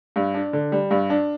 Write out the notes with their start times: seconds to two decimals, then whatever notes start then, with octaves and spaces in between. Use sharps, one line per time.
0.16 G2
0.34 D4
0.53 D3
0.72 G3
0.91 G2
1.10 D4